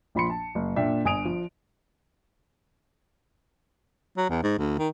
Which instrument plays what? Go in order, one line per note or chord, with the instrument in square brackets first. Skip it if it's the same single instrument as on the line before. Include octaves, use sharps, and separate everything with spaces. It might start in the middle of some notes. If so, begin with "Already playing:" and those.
[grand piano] A#1 F3 B5 C6 C#7
A5
F#1
A#2 D4 E5 G5
G1 G#5 D#6 D7 F7
F3
[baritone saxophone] F#3
E2
G#2
D2
D#3